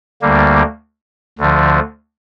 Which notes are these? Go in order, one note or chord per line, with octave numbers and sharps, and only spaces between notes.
D2 D3 G3 A#3
D2 D3 F3